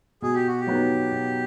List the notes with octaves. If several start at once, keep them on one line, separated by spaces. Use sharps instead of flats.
B2 G#4
G4
F#4
G4
F#3 B3 D#4
B2